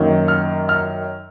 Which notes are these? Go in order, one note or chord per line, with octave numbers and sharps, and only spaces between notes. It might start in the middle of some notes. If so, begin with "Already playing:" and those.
Already playing: F#2 D#3 F#3 A#3
F6
F6